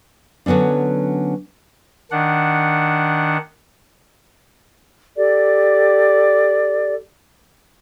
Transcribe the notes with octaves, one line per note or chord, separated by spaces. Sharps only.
D3 F#3 B3 C#4 D4
D#3 D4 F#5
G4 A4 D5